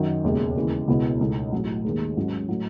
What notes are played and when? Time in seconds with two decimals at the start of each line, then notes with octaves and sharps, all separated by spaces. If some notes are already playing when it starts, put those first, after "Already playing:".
Already playing: F#2 D#3 F#3
0.24 E1 D#2 C#3 G#3
0.56 D#2 C#3 E3
0.87 C#2 B2 G#3 B3 E4
1.21 C#2 B2 A3 D#4
1.53 A1 A2 F#3
1.85 D#2 D#3 G#3
2.17 G#2 F#3 C#4
2.49 A2 F#3